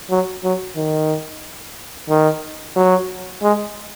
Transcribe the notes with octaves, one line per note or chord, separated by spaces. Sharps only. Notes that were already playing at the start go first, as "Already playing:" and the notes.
F#3
F#3
D#3
D#3
F#3
G#3